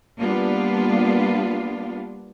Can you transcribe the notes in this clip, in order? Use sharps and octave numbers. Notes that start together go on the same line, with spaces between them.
G3 A#3 B3 D4 F4